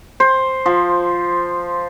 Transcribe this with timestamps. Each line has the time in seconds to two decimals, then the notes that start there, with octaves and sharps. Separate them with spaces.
0.20 C5
0.66 F3